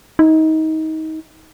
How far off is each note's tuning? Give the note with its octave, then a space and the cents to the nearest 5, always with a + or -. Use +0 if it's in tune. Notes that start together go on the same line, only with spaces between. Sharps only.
D#4 +25